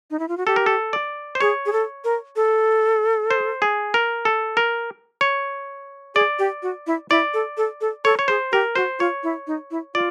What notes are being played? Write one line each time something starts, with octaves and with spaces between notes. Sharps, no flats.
D#4
E4
F4
F#4
G4 A4
A#4
A4
D5
C5
G#4 C#5
G#4
A4
A#4
A4
C5
G#4
A#4
A4
A#4
C#5
G#4 D5
G4
F#4
E4
E4 D5
A4
A4
A4
A4 C#5
C#5
G#4 C5
G4 A#4
F#4 C5
F4 C#5
E4
D#4
E4
F4 D5